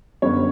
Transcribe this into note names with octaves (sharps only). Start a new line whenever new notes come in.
F#2 D3 G3 B3 C#5